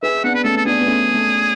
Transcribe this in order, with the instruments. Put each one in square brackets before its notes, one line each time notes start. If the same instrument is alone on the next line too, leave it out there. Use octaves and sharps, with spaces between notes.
[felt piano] G#4 B4 [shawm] E5
[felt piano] B3 D4 [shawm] F#5
[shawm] B4
[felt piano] A3 C#4 [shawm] A4
[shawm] A4
[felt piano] B3 D4 [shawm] G#4
[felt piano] B3
A3 C#4
A3